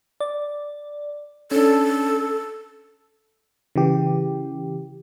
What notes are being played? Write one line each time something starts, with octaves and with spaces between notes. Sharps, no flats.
D5
C#4 D4 A4
C#3 E3 G4